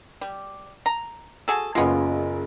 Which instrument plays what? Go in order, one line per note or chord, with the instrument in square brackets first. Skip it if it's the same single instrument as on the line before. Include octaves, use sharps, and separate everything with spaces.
[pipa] G3
A#5
F#4 G#4 A4
[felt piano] F#1 C#3 F4 [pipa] G#3 B3 C#4